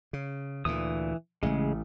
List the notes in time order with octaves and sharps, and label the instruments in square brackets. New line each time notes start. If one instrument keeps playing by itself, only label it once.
[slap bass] C#3
[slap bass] D2 A#2 [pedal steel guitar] E3 D#6
[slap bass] A1 A3 [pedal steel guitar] C#3 G#3